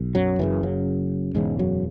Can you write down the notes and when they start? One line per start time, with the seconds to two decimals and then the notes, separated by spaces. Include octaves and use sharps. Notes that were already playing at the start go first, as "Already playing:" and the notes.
Already playing: B1
0.15 F#2 F#3
0.39 F#1 F#2 C#3 E3
0.63 F#2 F#3
1.35 E1 E2 G#2 C#3 G#3
1.59 F#2 F#3